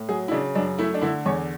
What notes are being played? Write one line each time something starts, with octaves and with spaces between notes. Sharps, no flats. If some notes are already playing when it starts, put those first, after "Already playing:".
Already playing: A2
F#3 G#4
E4
C#3 D4
F#2 D4
A3 E4
D4
D3 E4
E2 C#5